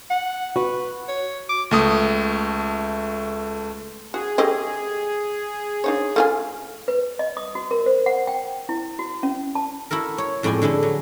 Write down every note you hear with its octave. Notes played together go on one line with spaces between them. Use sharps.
F#5
F#4 B4
C#5
D6
C#2 A3 D#6
F#4 G#4
A3 G4 D#5
D4 D#4 C#5
A3 F4 G#5
B4
D#5
D#6
F#4
A#4
C5
F#5
G5
E4
F#4
C#4
A5
E4 F#4 A4 A#4
C#5
F2 A2 G#3 D5 G5 G#5
D3 G#3 E4 A4
F#3